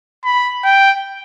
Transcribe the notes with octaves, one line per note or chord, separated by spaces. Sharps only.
B5
G5